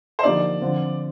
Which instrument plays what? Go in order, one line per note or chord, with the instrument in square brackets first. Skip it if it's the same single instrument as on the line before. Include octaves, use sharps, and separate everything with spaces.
[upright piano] C5
[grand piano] D3 F3 A#3 D#4 G4 [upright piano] D5
[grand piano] D3 F3 C4 F4